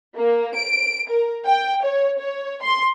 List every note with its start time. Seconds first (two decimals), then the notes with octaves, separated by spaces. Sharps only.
0.16 A#3
0.55 D7
1.08 A#4
1.46 G5
1.85 C#5
2.20 C#5
2.62 C6